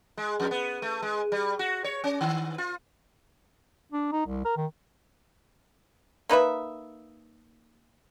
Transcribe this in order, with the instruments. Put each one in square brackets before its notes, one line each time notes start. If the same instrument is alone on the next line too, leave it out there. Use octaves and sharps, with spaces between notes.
[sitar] G#3
F2
B3
A3
G#3
G3
F#4
C#5
C#4
D#3
F4
[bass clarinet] D4
D#4
C2
A#4
D#3
[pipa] A#3 D#4 B4 E5